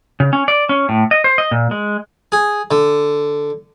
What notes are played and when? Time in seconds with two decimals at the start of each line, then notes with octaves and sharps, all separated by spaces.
0.20 C#3
0.33 C#4
0.48 D5
0.69 C#4
0.89 A2
1.11 D#5
1.24 C5
1.38 D#5
1.51 A#2
1.71 G#3
2.32 G#4
2.71 D3